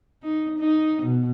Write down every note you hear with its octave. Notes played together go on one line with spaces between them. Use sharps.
D#4
D#4
B2